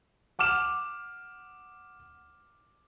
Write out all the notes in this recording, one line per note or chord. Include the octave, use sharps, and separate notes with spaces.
F#5 D6 F6 E7